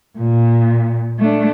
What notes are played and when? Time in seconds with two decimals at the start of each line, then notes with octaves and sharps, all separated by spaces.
0.18 A#2
1.19 A3 D4